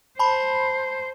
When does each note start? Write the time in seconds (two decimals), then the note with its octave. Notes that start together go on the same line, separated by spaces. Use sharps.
0.19 C5 A5 B5